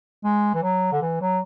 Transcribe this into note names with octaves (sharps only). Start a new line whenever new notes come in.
G#3
E3
F#3
D3
E3
F#3